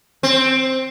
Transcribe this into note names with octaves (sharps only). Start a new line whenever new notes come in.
C4